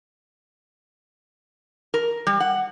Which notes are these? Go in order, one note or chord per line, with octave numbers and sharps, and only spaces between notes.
A#4
G3
F#5